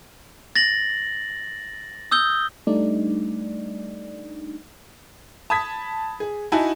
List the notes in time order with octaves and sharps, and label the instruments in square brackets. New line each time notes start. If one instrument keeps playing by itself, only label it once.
[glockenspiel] A6 A#6 F#7
D#6 E6 G6 G7
[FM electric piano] G3 A3 D4 D#4 D5
[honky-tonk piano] A5 B5 D#6 G#6 B6
G#4
D#4 E4 F#4 F#5 G#5 A5